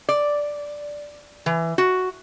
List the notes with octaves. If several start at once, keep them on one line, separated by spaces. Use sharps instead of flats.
D5
E3
F#4